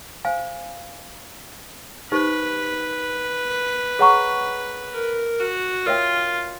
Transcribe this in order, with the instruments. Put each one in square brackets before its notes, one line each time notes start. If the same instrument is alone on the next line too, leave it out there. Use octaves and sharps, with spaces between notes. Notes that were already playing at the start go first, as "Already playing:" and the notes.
[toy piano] C5 F5 G#5
[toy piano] D#4 G4 C5 [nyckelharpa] B4
[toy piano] G#4 C#5 F#5 A#5 C#6
[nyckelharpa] A#4
F#4
[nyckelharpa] F4 [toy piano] A#4 C#5 E5 G5